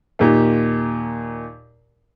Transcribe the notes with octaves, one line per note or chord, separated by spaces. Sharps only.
D#2 A#2 G4